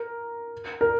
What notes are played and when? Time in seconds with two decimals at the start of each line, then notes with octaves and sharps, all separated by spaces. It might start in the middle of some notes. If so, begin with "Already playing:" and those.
Already playing: A#4
0.81 A#4